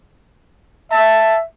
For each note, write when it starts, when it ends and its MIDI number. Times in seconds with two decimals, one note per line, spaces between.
0.92 1.44 76
0.92 1.37 81